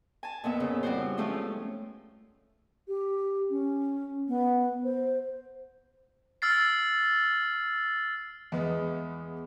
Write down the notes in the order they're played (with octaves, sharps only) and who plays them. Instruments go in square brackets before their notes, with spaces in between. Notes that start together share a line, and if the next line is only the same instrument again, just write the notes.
[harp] G#5 A5
F2 A#2 B3 E5
C#3
F3 G3 C4 E4 F#4 C5
F3 G#3 A3 C#4 E4 F4
[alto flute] G4
C#4
B3
C5
[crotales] E6 F6 A6 C7
[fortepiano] E2 G#3 B3